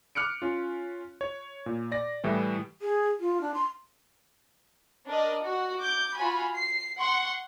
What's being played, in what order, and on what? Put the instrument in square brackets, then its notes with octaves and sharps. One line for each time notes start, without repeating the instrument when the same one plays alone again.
[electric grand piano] D6 F6 F#6 C#7 D7
C#4 F4
C#5
A#2
D5 A#6
A2 E3 G3
[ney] G#4
F4
D4
C6
[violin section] D4 A#4 D5 D#5
F#4
D6 G6
F4 F#4 G#5 B5
C7
F#5 C6 C#6